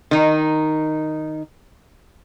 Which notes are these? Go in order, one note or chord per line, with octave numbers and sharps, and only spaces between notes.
D#3 D#4